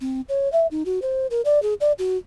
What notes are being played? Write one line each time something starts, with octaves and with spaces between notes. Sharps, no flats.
C4
C#5
E5
D#4
F#4
C5
A#4
D5
G#4
D5
F#4